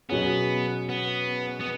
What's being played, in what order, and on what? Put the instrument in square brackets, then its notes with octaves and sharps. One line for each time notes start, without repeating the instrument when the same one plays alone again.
[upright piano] B2 F#3 C#4 G#4 [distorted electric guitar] B3
[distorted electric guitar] B3
B3